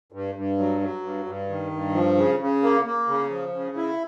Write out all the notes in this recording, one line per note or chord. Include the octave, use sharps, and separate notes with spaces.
G2
G2
F#3
F#3
G2
G2
D#3
G2
F3
C#3
C#3
A#3
A#3
C#3
F3
C#3
E4